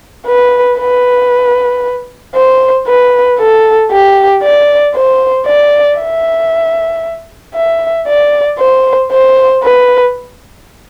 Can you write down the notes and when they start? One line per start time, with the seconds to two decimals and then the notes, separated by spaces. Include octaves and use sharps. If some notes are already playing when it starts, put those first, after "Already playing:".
0.27 B4
0.79 B4
2.35 C5
2.87 B4
3.39 A4
3.91 G4
4.43 D5
4.95 C5
5.47 D5
5.99 E5
7.55 E5
8.07 D5
8.59 C5
9.11 C5
9.63 B4